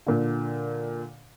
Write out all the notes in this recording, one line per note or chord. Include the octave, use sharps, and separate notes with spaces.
A#2 D3